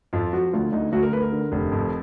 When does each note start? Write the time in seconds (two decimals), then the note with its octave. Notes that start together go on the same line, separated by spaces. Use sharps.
0.13 F2 F4
0.33 F3 F#4
0.53 D2 F4
0.72 D2 D#4
0.92 D2 F#4
1.03 A#4
1.13 D2 B4
1.22 A#4
1.32 D3
1.52 F1
1.72 F2